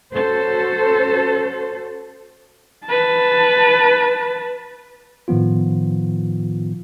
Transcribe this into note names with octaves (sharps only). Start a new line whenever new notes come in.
C#4 F#4 A4 C5
B4 A5
A2 D#3 F3 B3 F4